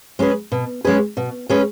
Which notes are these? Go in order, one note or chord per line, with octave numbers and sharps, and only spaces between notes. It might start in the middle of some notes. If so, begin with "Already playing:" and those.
G#3 C#4 G#4 B4
B2
G#3 C#4 G#4 B4
B2
G#3 C#4 G#4 B4